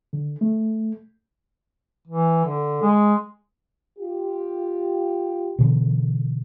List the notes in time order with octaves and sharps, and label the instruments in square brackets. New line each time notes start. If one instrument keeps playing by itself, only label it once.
[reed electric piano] D3
A3
[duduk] E3
D3
G#3
[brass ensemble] F4 G4
[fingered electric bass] B2 D3 E3